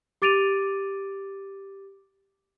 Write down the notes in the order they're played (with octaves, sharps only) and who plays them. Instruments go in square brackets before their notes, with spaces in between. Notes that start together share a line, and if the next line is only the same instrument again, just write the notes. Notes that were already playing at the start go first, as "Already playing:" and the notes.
[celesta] G4 D6 A6 D7 D#7 F7